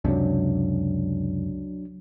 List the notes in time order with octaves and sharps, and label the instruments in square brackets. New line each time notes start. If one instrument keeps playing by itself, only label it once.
[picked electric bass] C#2 F#2 C3 [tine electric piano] F#3 D4